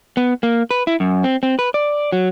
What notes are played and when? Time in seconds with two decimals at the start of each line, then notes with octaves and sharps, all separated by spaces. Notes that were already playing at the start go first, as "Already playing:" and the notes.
0.17 B3
0.43 A#3
0.71 B4
0.87 E4
1.00 F#2
1.24 C4
1.43 C4
1.59 B4
1.74 D5
2.12 F#3